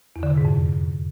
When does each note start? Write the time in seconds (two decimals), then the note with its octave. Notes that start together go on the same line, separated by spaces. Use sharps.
0.16 E2
0.23 D3
0.30 C3
0.37 G#2
0.45 F2